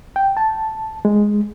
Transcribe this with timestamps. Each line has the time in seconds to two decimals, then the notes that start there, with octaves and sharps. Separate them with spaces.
0.16 G5
0.37 A5
1.05 G#3